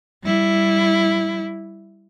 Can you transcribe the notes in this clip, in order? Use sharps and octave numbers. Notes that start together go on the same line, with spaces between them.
G3 E4